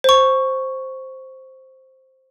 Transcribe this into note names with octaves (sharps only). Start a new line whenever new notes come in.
C5 C#6